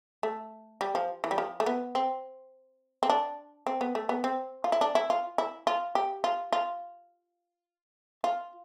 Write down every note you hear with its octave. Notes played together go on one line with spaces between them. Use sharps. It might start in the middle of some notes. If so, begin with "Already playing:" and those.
A3
G3
F3
E3
G3
F3
A3
B3
C4
C4
D4
C4
B3
A3
B3
C4
F4
E4
D4
E4
F4
E4
F4
G4
F4
F4
F4